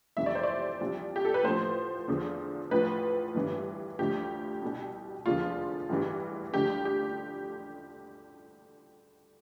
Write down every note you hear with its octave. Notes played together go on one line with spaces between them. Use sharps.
F1 F2 E3 G3 E5
D5
C5
D5
C2 C3 F3
G4
A4
B4
A1 A2 F3 C5
E2 D3 F3
A1 A2 F3 B4
G1 G2 E3 G3
D2 D3 F3 G4
C2 B2 G3
F1 E2 D3 F3 F4
A1 G2 E3 G3
D2 D3 F3 G4
G4